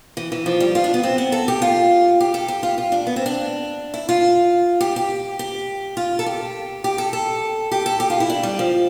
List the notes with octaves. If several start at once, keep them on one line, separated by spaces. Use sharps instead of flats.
E3
E3
F3
G3
F4
D4
B3
C4
B3
A4
G4
F4
G4
A4
G4
F4
F4
D4
B3
C4
D4
E4
F4
G4
G4
G4
F4
A4
G4
G4
A4
A4
G4
A4
G4
F4
E4
D4
G3
F3